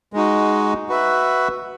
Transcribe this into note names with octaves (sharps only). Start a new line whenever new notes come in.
G#3 D#4 F#4
F#4 B4 E5